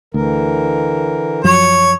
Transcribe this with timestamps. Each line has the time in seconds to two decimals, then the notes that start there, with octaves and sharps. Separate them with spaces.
0.14 D2 D3 E3 A#4
1.44 F#2 F3 F#3 C#5